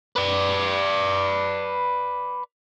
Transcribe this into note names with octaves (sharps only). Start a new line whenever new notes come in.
B4 D5